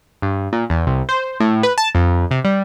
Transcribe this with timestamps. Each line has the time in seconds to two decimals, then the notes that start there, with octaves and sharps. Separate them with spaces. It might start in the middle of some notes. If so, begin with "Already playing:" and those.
0.22 G2
0.53 A#2
0.70 E2
0.87 C2
1.09 C5
1.40 A2
1.63 B4
1.78 A5
1.95 F2
2.31 C3
2.45 G3